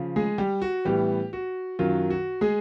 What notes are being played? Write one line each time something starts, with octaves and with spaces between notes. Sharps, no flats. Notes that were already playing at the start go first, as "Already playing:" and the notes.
Already playing: C#3 F3
G#3 G#4
G3 G4
F#4
A2 E3 G3 B3 G4
F#4
F#2 D#3 F#3 F4
F#4
G#3 G#4